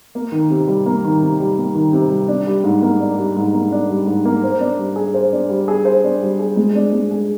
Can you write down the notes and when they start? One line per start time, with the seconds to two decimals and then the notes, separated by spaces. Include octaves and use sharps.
0.15 A#3
0.32 D#3
0.50 C3
0.68 G3
0.86 A#3
1.05 D#3
1.22 C3
1.40 G3
1.58 A#3
1.75 D#3
1.93 C3
2.11 G3
2.28 D4
2.47 G3
2.64 G#2
2.82 A#3
3.00 D4
3.17 G3
3.36 G#2
3.53 A#3
3.72 D4
3.90 G3
4.07 G#2
4.25 A#3
4.44 C5
4.60 D4
4.78 G3
4.96 G#4
5.14 C5
5.33 D4
5.49 G3
5.68 G#4
5.85 C5
6.04 D4
6.22 G3
6.39 G#4
6.56 G#3
6.75 D4
6.93 G#3
7.11 G#4